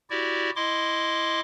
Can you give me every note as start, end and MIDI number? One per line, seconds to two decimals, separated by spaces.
0.10 0.50 64
0.10 0.50 66
0.10 0.50 67
0.10 0.50 74
0.56 1.41 64
0.56 1.41 75
0.56 1.41 84
0.56 1.41 86